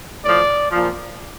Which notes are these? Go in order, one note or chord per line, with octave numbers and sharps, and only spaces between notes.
A2 F3 D5
A#2 F3